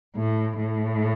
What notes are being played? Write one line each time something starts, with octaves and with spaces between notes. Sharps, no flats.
A2
A2